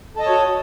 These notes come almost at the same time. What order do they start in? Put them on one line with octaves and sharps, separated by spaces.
A4 D#5 A5 C#5 F#4